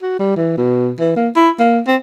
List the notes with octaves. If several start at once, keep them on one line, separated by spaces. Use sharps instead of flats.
F#4
G3
E3
B2
E3
A#3
E4
A#3
C4